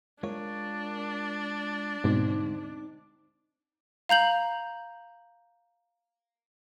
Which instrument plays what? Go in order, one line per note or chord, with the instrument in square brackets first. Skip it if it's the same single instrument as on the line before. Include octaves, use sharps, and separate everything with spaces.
[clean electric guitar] G#3 F4 C#5 [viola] D4 [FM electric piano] A#4
[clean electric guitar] D2 G#3 C5 [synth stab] G#2 B2 [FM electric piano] C4 D#4 D6
[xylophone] F5 A#5 G6 F#7